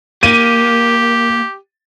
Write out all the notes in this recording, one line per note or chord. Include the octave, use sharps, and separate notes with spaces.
A#3 G4 D#7